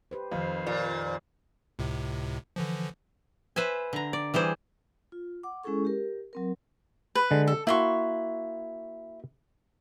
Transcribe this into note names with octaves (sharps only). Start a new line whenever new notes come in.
G4 B4 C5
F2 D#3 F3 C5 F5
A#2 F3
C#2 A2 C3
D3 E3 F3
B4 C5 E5 G#5
D3 A#5
D5
E3 G3 G#4 C5
F4
F#5 D6
G#3 C#4 E4 G#4 A4 C#6
G4 A#4
F#3 C4 A#4
B4
D3 G#3
A4
A#3 E4 F#4 C6 C#6